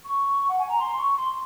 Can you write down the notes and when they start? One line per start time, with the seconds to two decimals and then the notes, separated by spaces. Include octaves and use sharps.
0.05 C#6
0.49 F#5
0.59 G#5
0.69 A#5
0.79 C6
0.98 C#6
1.17 C6